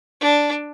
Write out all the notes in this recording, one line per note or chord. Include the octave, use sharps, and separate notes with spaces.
D4